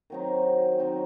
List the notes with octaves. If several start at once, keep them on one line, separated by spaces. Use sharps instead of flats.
D#3 F#3 C4 D#4
D#3 F#3 C4 D#4